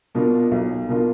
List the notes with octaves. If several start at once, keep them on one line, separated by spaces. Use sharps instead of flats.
B2 A#3 D4 F4
B1
B2 A#3 D4 F4